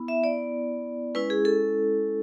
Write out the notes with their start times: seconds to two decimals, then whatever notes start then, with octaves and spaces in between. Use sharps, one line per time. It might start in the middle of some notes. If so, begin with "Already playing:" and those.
Already playing: B3 E4
0.08 E5
0.24 D5
1.15 G#3 C#4 E4 B4
1.30 G#4
1.45 A4